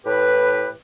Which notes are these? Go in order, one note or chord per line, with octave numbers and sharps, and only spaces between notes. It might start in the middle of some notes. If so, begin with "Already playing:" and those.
A2 E3 G4 B4